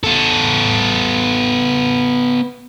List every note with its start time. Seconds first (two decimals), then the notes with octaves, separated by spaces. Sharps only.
0.04 B3 A4